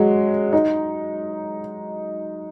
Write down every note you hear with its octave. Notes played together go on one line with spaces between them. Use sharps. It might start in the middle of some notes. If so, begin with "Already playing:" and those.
Already playing: F#3 G#3
D#4